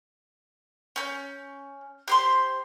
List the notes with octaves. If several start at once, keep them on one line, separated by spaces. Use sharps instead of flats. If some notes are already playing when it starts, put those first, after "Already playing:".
C#4 G6
G4 C5 C6